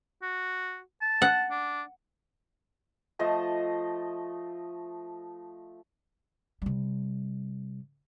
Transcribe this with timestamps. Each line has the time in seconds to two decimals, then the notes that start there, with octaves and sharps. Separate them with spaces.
0.23 F#4
1.02 A5
1.22 F#5
1.51 D4
3.19 F3 A3 D#5 A5
6.62 C3 G3